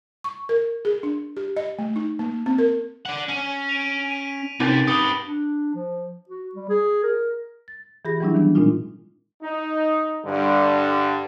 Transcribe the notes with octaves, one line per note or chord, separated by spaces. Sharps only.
C#6
A#4
G#4
D4
G4
D#5
A3
D#4
A#3
C4
A#4
D5 F#5
C#4
D7 D#7 F7
B6 D#7
C3 C4 C#4 D#4 G6 A6 D#7
G4 B4 D#6 C#7 G7
D4
F3
F#4
G3
G#4
A#4
A6
E3 F4 G4 G#4 B5 A#6
E3 F#3 G3 C#4 D4 E4
D#3 E3 B3 D4
A#2 G#3 C4 D4 D#4 F4
D#4
G2 D3